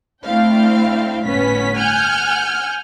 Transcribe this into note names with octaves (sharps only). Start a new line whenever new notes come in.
A3 C4 D4 E4 F5 G5
G1 A2 B3 C#4 B6
F#5 G#5 F6 G6